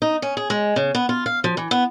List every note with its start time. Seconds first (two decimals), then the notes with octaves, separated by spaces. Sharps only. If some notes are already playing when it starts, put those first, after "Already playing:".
0.02 D#4
0.22 C#4
0.37 G#4
0.50 G#3
0.76 C#3
0.95 B3
1.09 F4
1.26 F5
1.44 F3
1.57 E3
1.71 B3